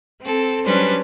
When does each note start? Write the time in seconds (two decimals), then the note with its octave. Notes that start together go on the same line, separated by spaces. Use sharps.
0.20 C4 A4
0.65 F#3 G3 C#4 D4 B4 C5